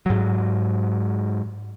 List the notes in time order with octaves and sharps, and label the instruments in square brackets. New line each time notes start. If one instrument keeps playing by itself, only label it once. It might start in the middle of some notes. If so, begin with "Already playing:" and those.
[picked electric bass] G#2 F#3